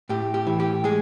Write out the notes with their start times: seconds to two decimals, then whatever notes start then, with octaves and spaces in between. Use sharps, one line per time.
0.09 A2 G4
0.34 G4
0.47 E3
0.60 G4
0.84 G#3 G#4